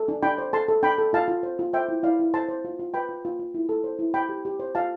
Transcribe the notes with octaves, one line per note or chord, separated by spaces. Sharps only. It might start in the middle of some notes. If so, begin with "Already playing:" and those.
Already playing: A4
D4
D4 G5 B5
C5
A4 A5 C6
A4
D4 G5 B5
A4
F4 F5 A5
F4
C5
F4
C5 E5 G5
E4
E4 D5 F5
E4
C5 A5 C6
C5
F4
F4
B4 G5 B5
F4
F4
F4
E4
A4
C5
E4
C5 G5 B5
G4
G4
C5
F4 F5 A5